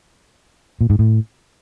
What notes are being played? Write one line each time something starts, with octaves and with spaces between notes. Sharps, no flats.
A#2
G#2
A2